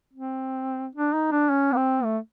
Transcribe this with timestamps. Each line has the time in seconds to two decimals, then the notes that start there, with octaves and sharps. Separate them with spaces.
0.13 C4
0.95 D4
1.13 D#4
1.32 D4
1.50 C#4
1.72 B3
1.76 C4
2.04 A3